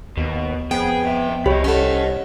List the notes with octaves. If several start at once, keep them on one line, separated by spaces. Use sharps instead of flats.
D#2 B2
F2 B3 G#4 G5
B2 E5
C2 G4 C#5 D#5 B5
C#4 A4 D#5 F#5